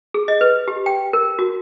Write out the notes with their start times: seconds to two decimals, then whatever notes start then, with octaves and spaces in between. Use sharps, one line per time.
0.14 G#4
0.28 D#5
0.41 B4
0.68 G4
0.86 G5
1.13 A#4
1.39 F#4